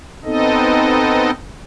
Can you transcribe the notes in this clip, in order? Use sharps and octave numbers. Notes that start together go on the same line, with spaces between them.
B3 C4 D#4 A4 D#5